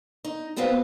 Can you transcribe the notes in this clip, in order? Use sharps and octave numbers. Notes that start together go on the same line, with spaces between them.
D#4
B2 B3 C4 B4 C5 F5